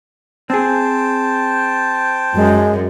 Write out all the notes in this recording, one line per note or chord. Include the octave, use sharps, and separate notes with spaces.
C4 G#4 C5 G5 A5
F#2 G#3